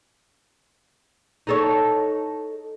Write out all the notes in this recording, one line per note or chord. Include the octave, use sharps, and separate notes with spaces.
D#4 A4 C#5